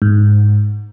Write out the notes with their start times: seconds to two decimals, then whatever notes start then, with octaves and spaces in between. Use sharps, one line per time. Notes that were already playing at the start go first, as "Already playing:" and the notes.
0.02 G#2